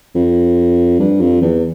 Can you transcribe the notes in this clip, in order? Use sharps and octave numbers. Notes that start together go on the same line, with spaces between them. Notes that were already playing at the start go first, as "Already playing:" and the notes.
F2
G2
F2
E2